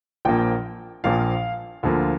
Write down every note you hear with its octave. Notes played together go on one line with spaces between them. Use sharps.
A#1 A#2 F3 A#3 G5
A#1 A#2 F3 A#3 F5
D2 D3 F3 A#3